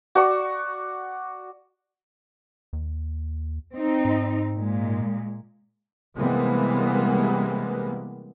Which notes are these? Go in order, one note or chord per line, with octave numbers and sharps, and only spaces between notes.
F#4 D5 C#6
D#2
C4 D#4
G#2
A#2 G#3
C3 E3 G3 G#3 A#3 B3